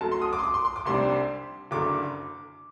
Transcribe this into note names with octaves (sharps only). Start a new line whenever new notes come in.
F#2 F#3 A3 A5
C6
D#6
D6
C6
D6
C6
C6
D6
C2 C3 G3 D4 C6
F#1 F#2 D3 D6